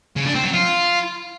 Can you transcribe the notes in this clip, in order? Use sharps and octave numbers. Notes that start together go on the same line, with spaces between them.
C#3
D4
C4
F#3
F4